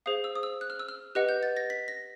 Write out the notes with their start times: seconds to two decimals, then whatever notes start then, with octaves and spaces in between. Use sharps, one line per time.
0.06 G#4 C5 F5 D#6
0.24 E6
0.35 D#6
0.43 E6
0.61 F#6
0.70 F6
0.80 E6
0.89 F6
1.15 G4 B4 D#5 F#5 F#6
1.29 G6
1.43 A6
1.57 A#6
1.70 B6
1.88 A#6